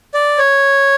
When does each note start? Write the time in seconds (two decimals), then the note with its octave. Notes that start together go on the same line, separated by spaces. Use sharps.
0.14 D5
0.38 C#5